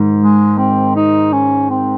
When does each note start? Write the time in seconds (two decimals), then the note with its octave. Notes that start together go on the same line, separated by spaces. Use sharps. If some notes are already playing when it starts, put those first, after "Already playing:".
Already playing: G#2 D#3
0.21 G#3
0.58 C4
0.96 D#4
1.33 C#4
1.70 C4